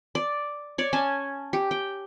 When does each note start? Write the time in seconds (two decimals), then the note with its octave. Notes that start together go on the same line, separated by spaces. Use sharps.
0.15 D5
0.78 C#5 D5
0.93 C#4 G#5 A5
1.53 G4
1.71 G5